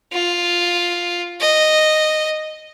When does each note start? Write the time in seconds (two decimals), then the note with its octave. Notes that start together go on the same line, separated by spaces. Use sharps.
0.13 F4
1.40 D#5